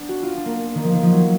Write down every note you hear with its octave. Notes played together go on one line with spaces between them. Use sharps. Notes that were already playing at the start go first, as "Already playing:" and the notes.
Already playing: B3 D4
F#4
F4
D4
A#3
D#3
F3
D#3
F3
F#3